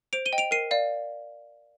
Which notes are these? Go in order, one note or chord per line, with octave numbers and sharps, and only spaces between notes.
C5 D7 F7
D#7 G7
D#5 G5
D7 F7
A#4 C7 D#7
D5 F5